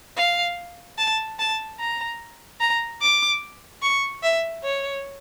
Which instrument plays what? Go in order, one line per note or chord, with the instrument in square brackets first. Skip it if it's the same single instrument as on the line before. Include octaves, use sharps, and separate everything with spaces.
[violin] F5
A5
A5
A#5
A#5
D6
C#6
E5
C#5